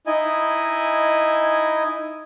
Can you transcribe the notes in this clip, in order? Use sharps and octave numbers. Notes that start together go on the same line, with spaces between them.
D#4 E4 D#5 G#5